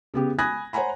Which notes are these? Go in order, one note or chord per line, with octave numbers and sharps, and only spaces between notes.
C#3 B3 G4
G#5 B5 D#6 F#6 G#6 A#6
C5 C#5 F#5 G#5 A#5 B5